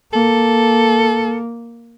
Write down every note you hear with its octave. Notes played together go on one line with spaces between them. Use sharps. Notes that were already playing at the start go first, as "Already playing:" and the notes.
A#3 A4